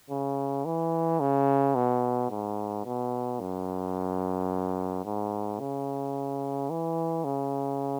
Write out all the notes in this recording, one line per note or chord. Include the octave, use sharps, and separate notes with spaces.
C#3
E3
C#3
B2
G#2
B2
F#2
G#2
C#3
E3
C#3